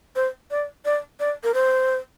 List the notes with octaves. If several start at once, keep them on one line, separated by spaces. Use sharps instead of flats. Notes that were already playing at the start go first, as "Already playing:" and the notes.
C5
D5
D5
D5
A#4
C5